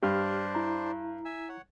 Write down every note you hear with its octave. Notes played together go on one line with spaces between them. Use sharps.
G2 D4 G4 C5 D5 F6
E4 A#5
E5 G#5 E6
C#5 F#5